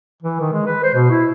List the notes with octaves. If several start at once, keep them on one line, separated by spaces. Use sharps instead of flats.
E3
D#3
G#3
B4
C5
B2
E4